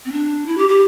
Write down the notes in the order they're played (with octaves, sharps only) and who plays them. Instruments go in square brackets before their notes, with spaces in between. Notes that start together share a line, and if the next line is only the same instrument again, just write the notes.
[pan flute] C4
D4
E4
G4
G4